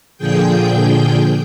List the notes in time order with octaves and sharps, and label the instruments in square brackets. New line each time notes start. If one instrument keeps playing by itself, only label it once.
[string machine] A#2 D3 F3 G#4 G5 G6